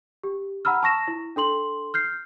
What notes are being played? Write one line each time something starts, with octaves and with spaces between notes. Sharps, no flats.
G4
F#5 A#5 B5 E6 F6
A5 C#6 A#6 E7
E4
D4 A4 C6 F#7
F6 G6 C7